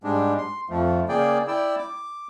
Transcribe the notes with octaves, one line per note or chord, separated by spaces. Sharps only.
G#2 G3 G#3 D4
C6
F2 F3 A3
C#3 A#3 G#4 D5 G5
E4 D5 G5 E6
D6